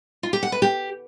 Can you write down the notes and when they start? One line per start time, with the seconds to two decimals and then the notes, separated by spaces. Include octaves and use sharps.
0.23 F4
0.33 G4
0.43 F#5
0.52 B4
0.62 G4